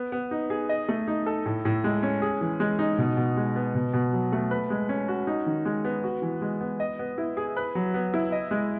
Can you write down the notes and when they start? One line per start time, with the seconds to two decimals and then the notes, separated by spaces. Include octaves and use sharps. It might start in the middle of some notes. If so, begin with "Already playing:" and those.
Already playing: B3
0.12 B3
0.31 D#4
0.50 G#4
0.69 D#5
0.88 A3
1.07 D#4
1.26 A4
1.46 A2
1.65 A2
1.84 G#3
2.03 C#4
2.22 G#4
2.41 E3
2.60 G#3
2.79 D#4
2.98 B2
3.17 B2
3.37 G#3
3.56 B3
3.75 B2
3.93 B2
4.13 F#3
4.32 A3
4.51 B4
4.70 G#3
4.89 C#4
5.08 F#4
5.27 D#4
5.46 D#3
5.65 G#3
5.85 B3
6.04 F#4
6.22 E3
6.42 G#3
6.61 B3
6.80 D#5
6.99 B3
7.18 E4
7.37 G#4
7.56 B4
7.75 F#3
7.94 B3
8.14 E4
8.32 D#5
8.51 G#3